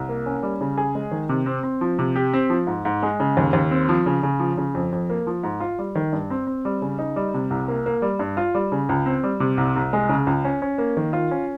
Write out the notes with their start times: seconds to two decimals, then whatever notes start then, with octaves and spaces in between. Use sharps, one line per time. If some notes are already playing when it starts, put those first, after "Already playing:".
Already playing: C2
0.09 A#3
0.26 C#4
0.43 G3
0.61 C#3
0.78 G#4
0.95 G#3
1.11 D#3
1.29 C3
1.46 C4
1.63 C4
1.81 F3
1.99 C3
2.16 G4
2.33 C4
2.50 F3
2.67 G#2
2.85 G#2
3.03 G#3
3.20 C#3
3.37 D#2
3.53 D#2
3.71 C4
3.89 F3
4.06 C#3
4.23 C#3
4.39 F3
4.58 C#3
4.75 F2
4.92 F2
5.10 A#3
5.27 F3
5.43 G#2
5.60 F4
5.79 G3
5.95 D#3
6.13 G2
6.30 C4
6.47 C4
6.65 G3
6.82 C#3
6.98 D#4
7.16 G3
7.34 C3
7.50 C2
7.68 A#3
7.86 A#3
8.02 G3
8.19 G2
8.37 F4
8.55 G3
8.72 C#3
8.89 C#2
9.06 C4
9.23 G3
9.40 C3
9.57 C2
9.76 C2
9.93 G#3
10.09 C#3
10.27 C#2
10.45 C#4
10.62 C#4
10.78 A#3
10.97 D#3
11.13 F4
11.31 C#4